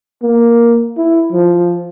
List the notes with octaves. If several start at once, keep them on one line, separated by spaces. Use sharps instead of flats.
A#3
E4
F3